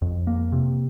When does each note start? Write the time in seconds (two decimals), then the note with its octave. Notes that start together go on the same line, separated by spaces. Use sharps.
0.02 F2
0.27 A#3
0.52 C3